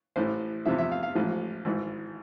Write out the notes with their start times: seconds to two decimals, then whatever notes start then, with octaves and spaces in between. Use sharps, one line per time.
0.16 A1 A2 E3 C5
0.66 E2 C3 F3 E5
0.78 E5
0.92 F5
1.03 F5
1.15 A1 G#2 F3
1.65 G#1 G#2 E3